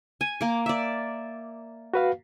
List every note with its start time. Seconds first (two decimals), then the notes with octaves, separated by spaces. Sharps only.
0.21 G#5
0.41 A#3 D6
0.66 D5 E5
1.94 F#4 B4 F5